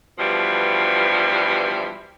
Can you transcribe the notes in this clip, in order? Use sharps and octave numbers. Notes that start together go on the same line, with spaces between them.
G2 B2 E3 F3 G3